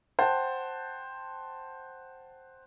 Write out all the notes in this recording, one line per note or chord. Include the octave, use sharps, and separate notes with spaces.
C5 F#5 G5 A5